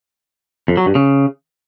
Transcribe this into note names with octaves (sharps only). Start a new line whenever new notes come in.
F2
F#3
G2
C#3